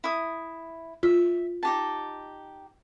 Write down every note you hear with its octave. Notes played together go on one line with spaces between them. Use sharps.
E4 D#6
F4 E5
D#4 G4 A5